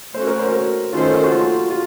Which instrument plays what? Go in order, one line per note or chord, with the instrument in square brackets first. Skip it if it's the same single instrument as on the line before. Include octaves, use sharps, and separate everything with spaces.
[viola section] A3 C#4 F#4 [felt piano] C5
[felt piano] A#4
C5
A#4
[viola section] D#3 A3 C#4 A4 C5 [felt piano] F4
[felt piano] F#4
F4
F4